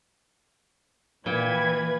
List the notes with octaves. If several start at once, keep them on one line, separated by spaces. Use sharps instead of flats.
A#2 E3 B4 G5 G#6